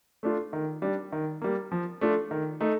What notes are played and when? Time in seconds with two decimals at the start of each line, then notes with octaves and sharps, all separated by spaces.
0.23 A3 D4 F4
0.53 D#3
0.82 G3 D4
1.12 D#3
1.42 G3 A#3
1.72 F3
2.01 A3 D4 F4
2.31 D#3
2.61 A3 D#4